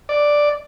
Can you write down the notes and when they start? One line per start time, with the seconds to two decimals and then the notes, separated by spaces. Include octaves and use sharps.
0.09 D5